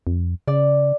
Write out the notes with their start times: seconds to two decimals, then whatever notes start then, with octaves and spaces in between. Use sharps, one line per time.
0.07 F2
0.48 C#3 D5